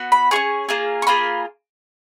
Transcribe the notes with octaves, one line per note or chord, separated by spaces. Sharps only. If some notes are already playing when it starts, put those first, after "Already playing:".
Already playing: B3 F#4
B5
C#4 F4 G#4 C#6
A#3 F4 G#4
C#6
A#3 F4 G#4 B5